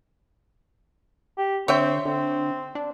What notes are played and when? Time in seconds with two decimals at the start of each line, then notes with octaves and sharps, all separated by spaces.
1.38 G4
1.68 D3 C4 C#5 E5 G5
2.06 D3 C4
2.75 D4